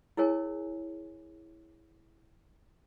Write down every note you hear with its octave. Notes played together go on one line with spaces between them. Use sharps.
E4 G#4 A#4 C#5 G#5